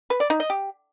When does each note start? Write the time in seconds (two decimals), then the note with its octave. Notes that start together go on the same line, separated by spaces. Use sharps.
0.10 B4
0.20 D5
0.30 D#4
0.40 D#5
0.50 G4